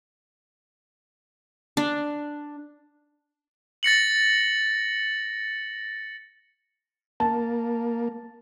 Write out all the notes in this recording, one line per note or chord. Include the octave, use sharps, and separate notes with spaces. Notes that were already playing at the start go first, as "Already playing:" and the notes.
D4
A6 A#6 C#7 F#7
A#3 A5